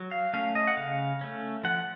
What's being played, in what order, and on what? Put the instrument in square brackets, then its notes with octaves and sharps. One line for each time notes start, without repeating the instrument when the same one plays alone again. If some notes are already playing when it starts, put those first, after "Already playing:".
Already playing: [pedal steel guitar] F#3
F5
A3 C#4 F5
D#5
F#5
C#3 F5
A3 C#4
F3 F#5